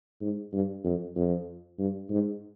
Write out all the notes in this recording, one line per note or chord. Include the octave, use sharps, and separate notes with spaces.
G#2
G2
F2
F2
G2
G#2